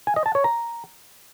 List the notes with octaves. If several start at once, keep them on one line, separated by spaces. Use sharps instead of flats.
G#5
D#5
A5
C#5
A#5